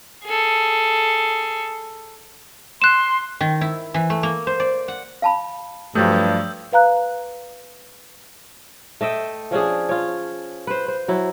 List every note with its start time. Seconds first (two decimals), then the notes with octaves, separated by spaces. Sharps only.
0.24 G#4 A4
2.82 C6 F#6 E7
3.41 D#3
3.61 E4
3.94 E3
4.10 A3
4.23 A#3
4.47 C5
4.60 D5
4.88 F#5
5.22 F5 A5 B5
5.95 G2 F3 F#3 A3 D#6 E6 G6
6.72 B4 F5 A#5 F#6
9.01 A3 D#5 E5 G5
9.51 F3 C#4 D4 G#4
9.89 F4 C#5
10.67 B4 C5
10.88 C5
11.08 F#3 E4